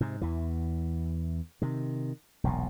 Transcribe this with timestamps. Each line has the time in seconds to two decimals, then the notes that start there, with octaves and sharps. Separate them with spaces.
0.01 G#2 C3
0.21 E2 E3
1.62 C3 D#3
2.44 E1 B1 A#2